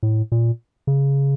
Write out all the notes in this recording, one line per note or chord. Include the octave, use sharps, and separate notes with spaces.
A2
A#2
C#3